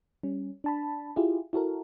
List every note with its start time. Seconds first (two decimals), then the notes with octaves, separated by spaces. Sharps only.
0.23 G3 C#4
0.64 D4 A5 B5
1.16 E4 F4 G4 G#4
1.53 E4 F#4 A4 A#4